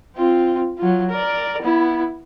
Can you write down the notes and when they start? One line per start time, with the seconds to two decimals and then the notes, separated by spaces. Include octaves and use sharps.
0.16 C4 F4
0.78 F#3 F4
1.10 A#4 D5
1.62 B3 E4